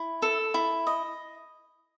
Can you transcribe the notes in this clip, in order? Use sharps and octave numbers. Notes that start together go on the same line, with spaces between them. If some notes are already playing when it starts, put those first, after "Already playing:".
Already playing: E4
A4
E4
D#5